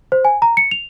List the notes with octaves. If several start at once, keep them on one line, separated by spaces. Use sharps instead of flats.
C5
G#5
A#5
C#7
F7